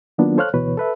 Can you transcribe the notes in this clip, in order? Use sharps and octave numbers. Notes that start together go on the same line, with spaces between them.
D#3 F#3 A#3 B3 D4 F4
A4 C5 C#5 F5 F6 F#6
D2 B2 E3 B4 C#5
A4 B4 E5